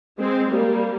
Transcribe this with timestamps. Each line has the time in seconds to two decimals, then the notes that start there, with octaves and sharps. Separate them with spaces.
0.18 G#3 C4
0.50 G3 A#3